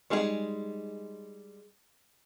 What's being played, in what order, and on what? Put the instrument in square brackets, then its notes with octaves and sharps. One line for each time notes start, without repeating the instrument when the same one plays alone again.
[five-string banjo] G3 G#3 D#4 F#4 G#4